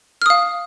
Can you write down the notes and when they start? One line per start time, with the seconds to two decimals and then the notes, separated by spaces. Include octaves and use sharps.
0.22 F6
0.26 D#6
0.30 F5